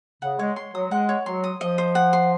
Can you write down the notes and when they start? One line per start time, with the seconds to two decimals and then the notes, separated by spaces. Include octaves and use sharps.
0.22 C#3 F#5
0.39 G#3 C#5
0.56 C6
0.74 F#3 D#6
0.91 G#3 F#5
1.09 C#5
1.26 F#3 C6
1.44 D#6
1.60 F3 D#5
1.78 C5
1.95 F#5
2.13 C6